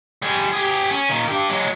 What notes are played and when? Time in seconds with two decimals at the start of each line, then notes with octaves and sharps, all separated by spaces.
0.22 G3 G#4
0.53 G4 G#4
0.91 C#4
1.09 A#2 D#3
1.28 D4 G4
1.49 F#3 G#3